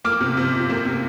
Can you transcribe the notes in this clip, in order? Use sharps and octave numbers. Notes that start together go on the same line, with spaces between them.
A#3 D6 F6
C3
C3
F3
A#3
C3